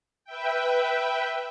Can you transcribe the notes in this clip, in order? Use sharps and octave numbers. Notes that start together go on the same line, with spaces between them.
B4 E5 G5